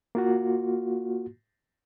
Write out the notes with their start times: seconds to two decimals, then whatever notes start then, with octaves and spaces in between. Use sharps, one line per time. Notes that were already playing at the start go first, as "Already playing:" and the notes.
0.15 A#3 F4 F#4